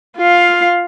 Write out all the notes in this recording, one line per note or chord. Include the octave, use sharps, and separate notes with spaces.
F4 F5